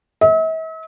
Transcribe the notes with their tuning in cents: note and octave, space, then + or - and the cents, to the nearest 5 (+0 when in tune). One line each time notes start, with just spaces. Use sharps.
E5 -45